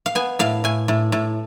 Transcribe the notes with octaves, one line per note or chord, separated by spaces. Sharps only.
F5
B3 G#5
A2 F5
A2 G#5
A2
A2